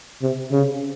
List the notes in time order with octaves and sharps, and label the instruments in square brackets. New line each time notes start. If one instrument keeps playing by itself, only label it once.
[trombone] C3
C#3